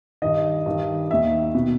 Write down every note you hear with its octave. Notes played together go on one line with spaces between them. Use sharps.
G2 D#3 D#5
G2 D#3
D#2 D#3 E5
B2